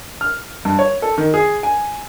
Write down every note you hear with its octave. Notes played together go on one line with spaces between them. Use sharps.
F6
G2
C#5
A4
D#3
G#4
G#5